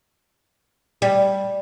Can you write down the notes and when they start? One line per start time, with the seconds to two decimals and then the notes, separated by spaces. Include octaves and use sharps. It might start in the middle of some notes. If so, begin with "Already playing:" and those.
1.02 G3